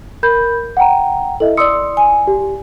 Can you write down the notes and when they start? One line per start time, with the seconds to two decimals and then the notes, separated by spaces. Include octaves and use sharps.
0.23 A#4 B5 G6
0.77 F#5 G5 A#5
1.40 E4 A4 D#5 E5
1.57 D5 C6 D#6 E6 C#7
1.97 G#5
2.27 G4